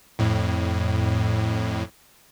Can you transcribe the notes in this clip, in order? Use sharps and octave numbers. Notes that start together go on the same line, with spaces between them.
F2 A2